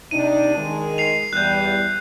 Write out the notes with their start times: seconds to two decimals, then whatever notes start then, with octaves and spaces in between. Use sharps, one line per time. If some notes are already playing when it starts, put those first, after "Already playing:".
0.11 C3 D4 D#4 D#7
0.56 D#3 G#3
0.98 C7 F7
1.33 E2 G3 F#6 G6